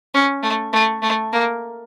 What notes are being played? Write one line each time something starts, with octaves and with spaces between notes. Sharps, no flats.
C#4
A3
A3
A3
A#3